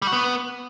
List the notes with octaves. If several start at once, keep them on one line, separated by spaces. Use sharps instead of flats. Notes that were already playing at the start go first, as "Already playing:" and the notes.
G3
F#4
B3